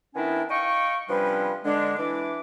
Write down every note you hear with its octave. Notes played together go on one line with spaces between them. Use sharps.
D#3 B3 C#4 D4 E4
D#5 F5 G5 C#6
C3 F3 G3 C#4 D4 B4
D3 G#3 D4
E3 D4 D6